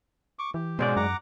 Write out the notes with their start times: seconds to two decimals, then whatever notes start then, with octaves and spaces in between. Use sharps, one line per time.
0.39 C#6 D6
0.54 E3 G4
0.79 G#2 B2 G#3 C#4 F#4 C5 D5
0.96 F#2 F#5 A#5 D6